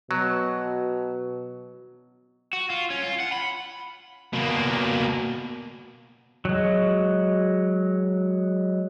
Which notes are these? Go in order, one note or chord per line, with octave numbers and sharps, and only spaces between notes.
B2 F#3
F#4
F4
C#4
F4
F#5
B5
B2 A#3
F#3 G#3